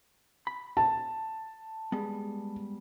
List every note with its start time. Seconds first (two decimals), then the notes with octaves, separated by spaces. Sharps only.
0.47 B5
0.77 A5
1.92 G3 G#3 B3